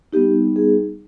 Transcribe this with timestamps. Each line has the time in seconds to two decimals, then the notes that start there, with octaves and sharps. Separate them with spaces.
0.13 G3 B3 D#4 G4
0.56 G#4